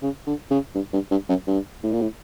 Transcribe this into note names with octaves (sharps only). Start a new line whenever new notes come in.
C#3
D3
C#3
G2
G2
G2
F#2
G2
A2
A#2
A2